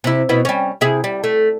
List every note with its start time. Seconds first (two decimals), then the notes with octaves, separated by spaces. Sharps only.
0.04 C3 E4
0.29 B2 B3 E4
0.45 G3 C#4
0.81 C3 E4 G#4
1.04 G3
1.24 A3